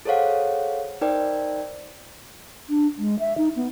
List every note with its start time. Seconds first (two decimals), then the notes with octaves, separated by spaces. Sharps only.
0.05 G#4 A4 C5 C#5 F5 F#5
1.01 D#4 A#4 C5 D5 G5
2.69 D4
2.98 G#3
3.19 E5
3.38 D#4
3.56 B3